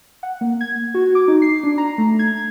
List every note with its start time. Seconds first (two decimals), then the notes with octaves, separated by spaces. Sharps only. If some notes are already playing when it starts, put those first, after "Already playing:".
0.23 F#5
0.41 A#3
0.61 G#6
0.94 F#4
1.15 D6
1.28 D#4
1.42 C7
1.63 D4
1.78 A#5
1.98 A3
2.19 G#6